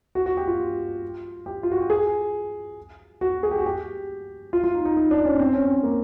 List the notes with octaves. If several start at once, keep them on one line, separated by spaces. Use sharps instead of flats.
F#4
F#4
G4
F4
G4
F4
F#4
G4
G#4
F#4
G#4
G4
F#4
G4
F4
F4
D#4
D#4
D#4
D4
C#4
C4
C#4
C4
A#3